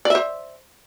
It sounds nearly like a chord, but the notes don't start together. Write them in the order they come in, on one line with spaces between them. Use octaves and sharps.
D5 E5 C5